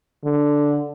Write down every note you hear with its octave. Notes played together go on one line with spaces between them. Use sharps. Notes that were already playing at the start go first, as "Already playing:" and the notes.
D3